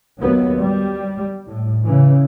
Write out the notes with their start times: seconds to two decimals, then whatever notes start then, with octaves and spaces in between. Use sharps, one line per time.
0.20 D#2 F#3 B3
0.61 G3
1.47 A2
1.83 C#3 E3